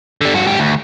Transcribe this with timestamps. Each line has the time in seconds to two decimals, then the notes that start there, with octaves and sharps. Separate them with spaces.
0.21 D3 G3
0.34 G2 F#4
0.47 G#2 G4
0.59 D2